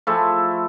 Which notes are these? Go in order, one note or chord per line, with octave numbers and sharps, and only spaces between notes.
F3 A3 E4 A4